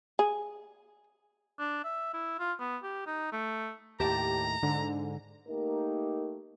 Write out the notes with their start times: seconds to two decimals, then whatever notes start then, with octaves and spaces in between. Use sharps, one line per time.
0.19 G#4
1.59 D4
1.85 E5
2.14 E4
2.39 F4
2.60 B3
2.83 G4
3.07 D#4
3.32 A3
4.00 D#2 A2 G4 A5 A#5
4.63 G#2 D3
5.48 A3 A#3 D#4 G4 A#4